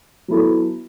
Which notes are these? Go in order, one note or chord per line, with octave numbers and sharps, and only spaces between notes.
F#3 B3 E4 A4